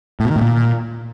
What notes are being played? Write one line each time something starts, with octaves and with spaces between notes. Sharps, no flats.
A2
B2
D#3
A2
A#2